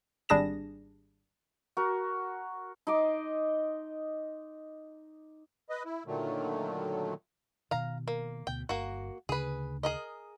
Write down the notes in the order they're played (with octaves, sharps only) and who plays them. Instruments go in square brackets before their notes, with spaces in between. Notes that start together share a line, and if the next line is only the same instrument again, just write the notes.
[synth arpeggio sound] G#1 G3 D4 G#4 A#6 E7
[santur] F#4 A#4
[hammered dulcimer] D#4 D#5 C6 D6
[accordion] B4 D#5
E4
A#2 D3 D#3 F#3 A3
[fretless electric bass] B2 D#3 [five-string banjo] F5 A#5
[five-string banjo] A#3
[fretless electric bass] D2 B2 [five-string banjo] G5
[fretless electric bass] G1 [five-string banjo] A#3 F#4
[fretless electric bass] D2 C#3 D4 [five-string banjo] G#4 B4
[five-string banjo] G#4 A#4 D#5